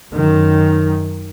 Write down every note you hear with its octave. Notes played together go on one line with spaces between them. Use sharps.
F#2 D#3